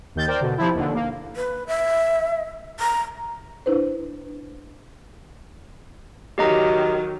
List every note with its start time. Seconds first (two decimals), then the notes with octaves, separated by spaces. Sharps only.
0.15 D#2 D#3 G6 A6
0.27 A#4 C5 D5 G5
0.41 B2 D3
0.58 C3 F3 E4
0.75 D#2 D3
0.94 A#3
1.36 B4
1.67 E5
2.80 A#5
3.66 D4 E4 B4 C5
6.38 D#3 F#3 G4 D#5 A#5